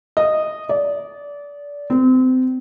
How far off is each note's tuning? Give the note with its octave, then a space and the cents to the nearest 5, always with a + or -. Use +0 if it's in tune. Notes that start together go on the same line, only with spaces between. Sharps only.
D#5 -10
D5 -25
C4 -30